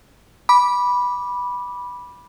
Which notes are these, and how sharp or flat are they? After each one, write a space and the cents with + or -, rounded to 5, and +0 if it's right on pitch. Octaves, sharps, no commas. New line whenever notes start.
B5 -10 D6 +0